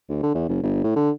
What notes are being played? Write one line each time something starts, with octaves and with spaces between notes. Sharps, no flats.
D2
D3
E2
F#1
G1
A2
D3